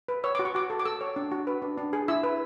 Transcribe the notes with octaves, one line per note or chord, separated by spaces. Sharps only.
B4
C#5 E6
F#4 D6
C#6
F#4 D6
A4
D6
A4 E6
C#5
D4
F#4
B4
D4
D4
G#4
E4 E6
B4